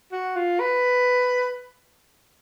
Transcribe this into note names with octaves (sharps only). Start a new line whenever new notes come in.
F#4
F4
B4